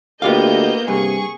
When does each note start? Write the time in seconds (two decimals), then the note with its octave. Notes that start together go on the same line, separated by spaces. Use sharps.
0.22 D2 A#3 B3 F4 G4 D#5 F5 G6
0.88 G2 C3 G#4 C#6